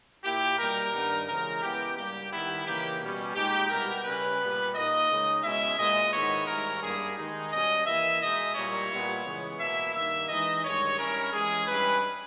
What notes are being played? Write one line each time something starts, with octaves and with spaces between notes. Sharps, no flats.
A#2 A#3 E4 G4
B2 G3 A#3 D#4 A#4
G2 D#3 G3 B3 D#4
C#3 E3 G#3 A#4
C#3 G#3 B3 E4 G4
G2 G3 A#3 G4
D#3 G3 B3 E4
C#3 E3 A#3 D#4 G4
B2 G3 C#4
A#2 G#3 D#4 G4
B2 G3 B3 E4 A#4
C#3 G3 C#4 E4 B4
A#2 G3 B3
A#2 A#3 D#4 D#5
C#3 G#3 D#4
B2 G#3 C#4 E4 E5
A#2 G#3 B3 D#5
G#2 D#3 G#3 B3 E4 C#5
G#2 D#3 G3 C#4 E4 A#4
G2 G3 A#3 E4 G#4
D#3 G#3 D#4
B2 G3 C#4 D#5
E3 A#3 E4 E5
B2 G#3 D#4 D#5
A#2 G3 A#3 C#4 E4 C#5
A#2 G3 B3 E4
C#3 E3 G#3 B3
B2 A#3 E4 E5
G2 D#3 A#3 E5
E3 G#3 D#4 D#5
G2 D#3 G#3 C#5
G2 G3 C#4 E4 A#4
E3 G#3 C#4 G#4
G2 G3 C#4 E4 B4